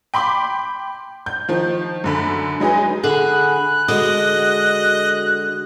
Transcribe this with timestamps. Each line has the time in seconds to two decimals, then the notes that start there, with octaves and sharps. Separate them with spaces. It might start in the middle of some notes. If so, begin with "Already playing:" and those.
0.14 G5 B5 C6 D6
1.26 G6
1.49 D#3 F3
2.04 F#2 D3 B5
2.60 F#3 G#3 D#4 G#4 B4
3.03 D3 G#4 F#5 B5 F#6
3.88 D3 G#3 F#4 D#5